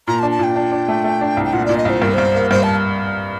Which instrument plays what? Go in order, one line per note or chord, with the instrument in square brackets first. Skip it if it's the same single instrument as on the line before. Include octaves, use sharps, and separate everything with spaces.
[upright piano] A#2 [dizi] A#5
[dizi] A5
[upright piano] D4
[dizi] A5
[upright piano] A#2 [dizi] G5
[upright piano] D4
D4
A3
A3
D4
C2
[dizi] G5
[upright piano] A#2 [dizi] F#5
[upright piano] A#2 [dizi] D5
[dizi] D#5
[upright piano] C2 [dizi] C5
[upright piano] G2 [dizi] A#4
[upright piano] G2 [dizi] C5
[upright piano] A#3
[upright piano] G2 [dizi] C5
[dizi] A5